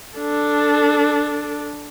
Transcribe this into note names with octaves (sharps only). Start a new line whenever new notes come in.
D4 A4